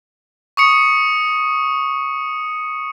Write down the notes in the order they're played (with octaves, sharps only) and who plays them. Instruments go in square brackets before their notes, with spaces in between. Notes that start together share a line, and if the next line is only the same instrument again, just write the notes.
[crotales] C#6 D#6 C#7